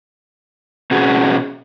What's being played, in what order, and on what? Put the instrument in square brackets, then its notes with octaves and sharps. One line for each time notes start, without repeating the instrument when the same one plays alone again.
[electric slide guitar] B2 C#4 F#4 G#4